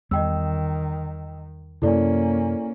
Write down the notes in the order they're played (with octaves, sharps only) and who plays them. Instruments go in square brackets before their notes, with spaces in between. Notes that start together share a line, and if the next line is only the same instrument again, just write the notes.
[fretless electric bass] E2 G3 [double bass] D#3 [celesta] D#5 G5 E6
[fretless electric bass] F#2 C3 [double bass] A#3 C#4 [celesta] E4 A4 D5